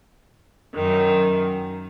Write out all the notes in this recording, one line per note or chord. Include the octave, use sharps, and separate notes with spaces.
F#2 D#3